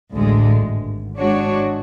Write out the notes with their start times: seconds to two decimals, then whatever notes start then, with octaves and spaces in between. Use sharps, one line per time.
0.13 A1 D2 A2 D3 G#3
0.65 G#1 G#2
1.17 G#3 D4 F#4 C#5